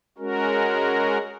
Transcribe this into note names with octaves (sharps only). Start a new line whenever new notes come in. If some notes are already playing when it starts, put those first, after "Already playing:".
G#3 C#4 F#4 A#4